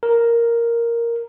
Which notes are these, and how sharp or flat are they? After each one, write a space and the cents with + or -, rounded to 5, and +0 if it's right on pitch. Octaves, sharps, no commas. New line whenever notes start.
A#4 +0